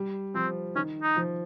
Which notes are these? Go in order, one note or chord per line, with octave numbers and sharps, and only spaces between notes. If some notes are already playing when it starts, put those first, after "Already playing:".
Already playing: G3
F3 C4
D#3 C#4
D#4
F3